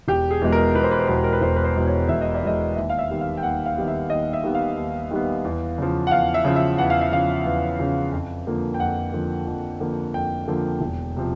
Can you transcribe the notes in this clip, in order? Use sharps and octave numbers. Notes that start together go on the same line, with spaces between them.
E1 G4
G#4
E2 B2 G#3
A#4
E1 B4
C5
B4
C5
E2 B2 G#3 B4
A#4
B4
E1 C5
B4
C5
E2 B2 G#3
C#5
E1 E5
D#5
D5
E2 B2 G#3 D#5
D#2 E5
F5
E5
D#3 G3 B3
F5
G5
D#2 F#5
F5
D#3 G3 B3
E5
D#2 D#5
E5
D#3 G3 B3
F5
D#2
D#3 G3 B3
E2
C#3 F3
F#5
E2 F5
E5
C#3 F3
E5
E2 F#5
F5
E5
C#3 F3 F5
E2
C#3 F3
F2
D3 F3 A#3
G5
F2 F#5
D3 F3 A#3
F2
D3 F3 A#3
F2 G5
D3 F3 A#3
E1
C3 F3